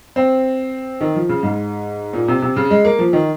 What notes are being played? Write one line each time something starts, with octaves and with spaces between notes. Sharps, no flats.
C4
D#3
F3
C#3
G#2
A#2
C3
C3
C#3
G#3
A#3
F3
D#3